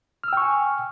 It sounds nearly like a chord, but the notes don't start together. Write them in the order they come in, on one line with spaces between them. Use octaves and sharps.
F6 E6 G5 C#6 G#5